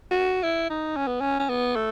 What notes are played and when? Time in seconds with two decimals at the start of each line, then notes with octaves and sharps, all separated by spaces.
0.11 F#4
0.43 E4
0.70 D#4
0.96 C#4
1.08 B3
1.21 C#4
1.39 C#4
1.49 B3
1.76 A3